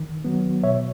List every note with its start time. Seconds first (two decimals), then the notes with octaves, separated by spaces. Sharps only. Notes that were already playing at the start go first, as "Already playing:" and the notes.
Already playing: D#3
0.25 F#3 B3
0.63 B2 C#5 E5